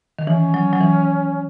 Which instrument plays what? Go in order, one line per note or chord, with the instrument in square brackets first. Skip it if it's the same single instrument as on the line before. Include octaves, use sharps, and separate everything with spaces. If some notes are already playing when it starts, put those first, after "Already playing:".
[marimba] D#3
[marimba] E3 [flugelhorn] C#4
[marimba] F#3
F#3
E3